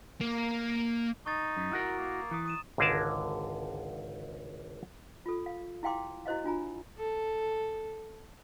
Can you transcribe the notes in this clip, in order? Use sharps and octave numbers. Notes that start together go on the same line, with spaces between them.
A#3
D#4 C#6 D#6 A6
F#2
E4 F#4 A#4
A#3
E3 A#5 D#6
D#6 D#7 E7
G#1 C#2 D3 G#4 A#4 A5
F4 A4
F5
E4 G4 F5 G5 C6 D6
E4 F#4 C5 D#5 F5
D4 F4 G#5 A#5
A4